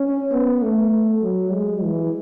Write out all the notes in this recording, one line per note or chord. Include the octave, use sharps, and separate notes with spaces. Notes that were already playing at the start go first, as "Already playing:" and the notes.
Already playing: C#4
B3
A3
F#3
G#3
E3